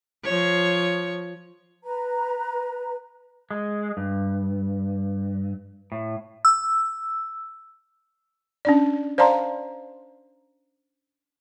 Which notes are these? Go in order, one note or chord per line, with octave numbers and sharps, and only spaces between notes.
F3 C#5
B4 A#5
G#3
G2
A2
E6
C#4 D4 D5
C5 D5 F5 A5 A#5 C6